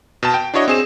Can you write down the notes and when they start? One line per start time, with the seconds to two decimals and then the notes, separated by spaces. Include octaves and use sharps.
0.23 B2 A5
0.34 G5
0.54 D4 E4 F#4 C#5 D#5
0.68 C4 G#4 E7